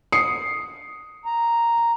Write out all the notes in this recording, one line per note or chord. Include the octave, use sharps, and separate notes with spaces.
D#6 C7 C#7
A#5